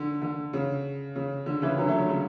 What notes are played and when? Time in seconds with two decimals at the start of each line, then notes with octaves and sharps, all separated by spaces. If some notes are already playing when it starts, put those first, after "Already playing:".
Already playing: D3
0.22 D3
0.53 C#3
1.16 C#3
1.46 D3
1.62 C#3 E3
1.78 D3 F#3
1.88 F#3 A3
1.99 D3
2.09 C#3